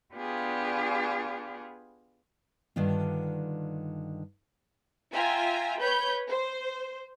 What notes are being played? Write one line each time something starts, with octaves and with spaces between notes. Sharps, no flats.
B3 D4 F4 G4 G#4
G2 D3 D#3 D4 F4
F4 E5 G5 G#5 A#5
B4 C#5 B5 G6
C5